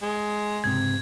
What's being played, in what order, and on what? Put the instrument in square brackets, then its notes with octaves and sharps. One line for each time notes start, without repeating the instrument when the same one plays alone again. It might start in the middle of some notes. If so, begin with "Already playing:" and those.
[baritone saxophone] G#3
[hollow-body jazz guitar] C#2 G#2 C3 [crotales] G#6